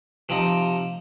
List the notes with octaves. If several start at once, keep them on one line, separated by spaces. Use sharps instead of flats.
C3 F3 C4 D#4